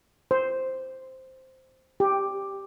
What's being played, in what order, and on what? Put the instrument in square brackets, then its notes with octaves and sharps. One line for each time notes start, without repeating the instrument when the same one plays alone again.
[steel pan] C5
G4